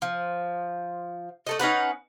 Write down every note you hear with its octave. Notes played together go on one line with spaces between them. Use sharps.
F3
A3 A4 D#5
C#4 D#4 B4 F#5